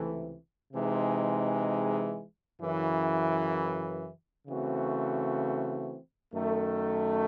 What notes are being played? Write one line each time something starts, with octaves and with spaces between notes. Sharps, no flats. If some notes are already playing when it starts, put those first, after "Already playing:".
Already playing: C#2 C3 E3 A3
C3 E3 G#3 D#4
F#2 C#3 E3
C#3 E3 A3 C4 F#4
F#2 D#3 A3